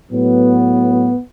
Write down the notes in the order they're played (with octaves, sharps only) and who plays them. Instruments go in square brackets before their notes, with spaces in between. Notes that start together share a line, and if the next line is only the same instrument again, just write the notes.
[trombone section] A2 F#3 B3